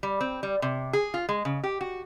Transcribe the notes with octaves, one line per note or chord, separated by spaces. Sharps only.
G3
C4
G3
C3
G#4
F4
G#3
C#3
G4
F#4